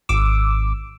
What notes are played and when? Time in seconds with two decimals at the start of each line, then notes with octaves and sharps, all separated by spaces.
0.09 G#1 D6 E6